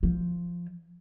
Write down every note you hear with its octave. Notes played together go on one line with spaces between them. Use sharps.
F3